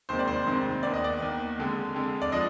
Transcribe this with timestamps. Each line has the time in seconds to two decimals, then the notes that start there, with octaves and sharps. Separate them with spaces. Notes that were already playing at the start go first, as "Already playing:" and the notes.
0.09 F1 D#2 D#3 G#3 C4 C5
0.19 D5
0.28 C5
0.47 F1 D#2 D#3 G#3 C4
0.83 D#2 D#3 B3 D5
0.94 D#5
1.04 D5
1.20 D#2 D#3 B3
1.58 F2 D3 G#3
1.94 F2 D3 G#3
2.22 D5
2.32 F3 G#3 D4 D#5